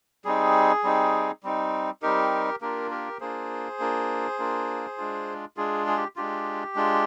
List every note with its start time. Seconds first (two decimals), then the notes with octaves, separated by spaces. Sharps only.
0.25 G3 C4 D#4 G#4
0.83 G3 C4 D#4
1.44 G3 C4 D#4
2.02 G3 C4 D#4 G4 A#4
2.61 A#3 D4 F4 G4 A#4
2.91 G4 A#4
3.21 A#3 D4 F4 G#4 C5
3.80 A#3 D4 F4
4.39 A#3 D4 F4
4.98 G#3 D4 F4
5.57 G#3 D4 F4 G#4
5.87 G#4
5.97 G4
6.16 G#3 D4 F4 G4
6.75 G#3 D4 F4